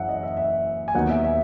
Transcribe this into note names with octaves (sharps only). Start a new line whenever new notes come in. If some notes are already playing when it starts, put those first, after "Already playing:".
Already playing: F#1 F#2 E3 E5 F#5
D#5
E5
E5
G#5
D#2 D#3 F#3 B3 D#4 F#5
E5
E5